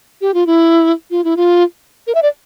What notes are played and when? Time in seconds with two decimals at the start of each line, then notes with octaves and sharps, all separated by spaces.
0.21 G4
0.34 F4
0.47 E4
1.11 F4
1.24 E4
1.37 F4
2.07 A#4
2.15 E5
2.22 D5